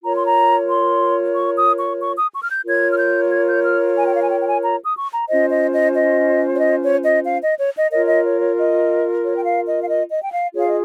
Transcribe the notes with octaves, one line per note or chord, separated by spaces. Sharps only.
F4 A#4 C#5 A#5
C6
A#5
C6
C#6
D#6
C#6
C#6
D#6
C#6
F6
G6
F4 A#4 C#5 G#6
F6
G6
G#6
G6
F6
G#5
G5
F5
G#5
G5
G5
G#5
A#5
D#6
C#6
A#5
C#4 F4 C5 D#5
D#5
D#5
D#5
C#5
D#5
C#5
D#5
F5
D#5
C#5
D#5
F4 A#4 C#5 D#5
D#5
C#5
C#5
D#5
C#5
G5
F5
D#5
F5
D#5
D#5
G5
F5
F4 G#4 C#5 F5
D#5